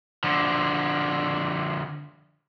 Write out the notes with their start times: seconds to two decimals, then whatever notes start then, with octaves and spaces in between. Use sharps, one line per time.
0.24 D3 F3